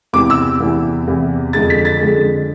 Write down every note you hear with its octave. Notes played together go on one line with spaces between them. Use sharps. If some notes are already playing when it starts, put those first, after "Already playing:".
E2 C3 E3 D6
E6
E2 C3 E3
E2 C3 E3
F2 D3 G#3 A6
B6
A6
F2 D3 G#3